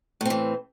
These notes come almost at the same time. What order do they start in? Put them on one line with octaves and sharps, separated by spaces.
A2 C4 E3